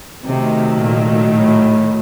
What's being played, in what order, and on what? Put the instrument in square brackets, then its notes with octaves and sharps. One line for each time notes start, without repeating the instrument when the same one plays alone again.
[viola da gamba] C3 [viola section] D#3 F#3 A3
[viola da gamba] A#2
A2